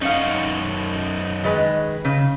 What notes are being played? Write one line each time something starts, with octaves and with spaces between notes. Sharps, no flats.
F#2 C#4 D#4 F5 F#5
D#3 G#3 B4
C#3